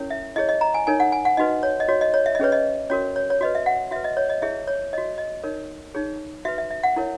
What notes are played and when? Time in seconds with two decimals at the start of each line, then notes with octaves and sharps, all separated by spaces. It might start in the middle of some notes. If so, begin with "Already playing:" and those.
Already playing: C#4 E4 A#4 C#5
0.10 E5
0.36 E4 G#4 C#5 D#5
0.49 D#5
0.61 A#5
0.74 G#5
0.87 D#4 A#4 C#5 G#5
1.00 F#5
1.12 G#5
1.25 F#5
1.37 D#4 F#4 B4 D#5
1.63 C#5
1.80 D#5
1.89 F#4 C#5
2.01 D#5
2.14 C#5
2.26 E5
2.35 D#5
2.40 C#4 G#4 B4 C#5
2.52 D#5
2.90 C#4 F#4 A#4 C#5
3.16 C#5
3.30 C#5
3.41 F#4 B4 D#5
3.55 E5
3.66 F#5
3.91 F#4 E5
3.96 B4
4.04 D#5
4.17 C#5
4.30 D#5
4.42 E4 G#4 C#5 E5
4.67 C#5
4.93 C#5 D#5
4.98 F#4
5.18 D#5
5.43 D#4 A#4 C#5
5.95 D#4 G#4 C#5
6.45 F#4 B4 E5
6.58 E5
6.71 E5
6.83 F#5
6.96 E4 A#4 C#5